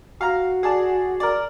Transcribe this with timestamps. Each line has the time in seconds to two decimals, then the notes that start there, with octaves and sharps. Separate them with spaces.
0.21 F#4 F5 A#5
0.63 G#4 D5 A5
1.20 A#4 D5